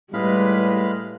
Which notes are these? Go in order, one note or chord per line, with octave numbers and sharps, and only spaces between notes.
A2 G3 G#3 B4 F5 B5